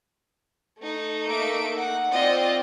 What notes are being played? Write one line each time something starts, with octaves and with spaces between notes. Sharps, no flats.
A3 D#4
A#3 E5 D7
F#5
C4 F4 D5 D#5